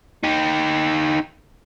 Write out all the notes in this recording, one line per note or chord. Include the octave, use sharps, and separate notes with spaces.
D#4 G4